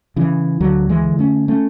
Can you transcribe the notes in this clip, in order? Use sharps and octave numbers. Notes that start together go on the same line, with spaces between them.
C#3 E3
D2 D3 F#3
E3 G#3
D3
A3 C#4
A3 C#4